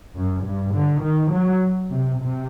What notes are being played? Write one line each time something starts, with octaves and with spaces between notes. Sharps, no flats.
F#2
G2
D3
D#3
F#3
C3
C3